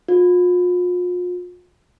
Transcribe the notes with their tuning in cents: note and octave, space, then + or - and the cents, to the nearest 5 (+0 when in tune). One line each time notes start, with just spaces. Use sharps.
F4 +40